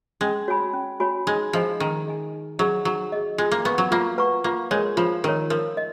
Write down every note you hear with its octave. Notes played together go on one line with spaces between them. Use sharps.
G#3 C#4
F#4 C#5 G#5 B5
C#4
F#4 C#5 G#5 B5
G#3 D#4
F3 G#4 D#5 G#5
D#3 D#4
G#4 D#5 G#5
D#4
F#3 G#4 D#5
F#3 D#4
G#4 D#5
G#3 F4
A#3
B3 B4 F#5 A#5 C#6
F#3
A#3 F4
B4 F#5 A#5 C#6
A#3 F4
G#3 A#4 C#5
F3 F4
D#3 A#4 C#5
F3 A#4
D#5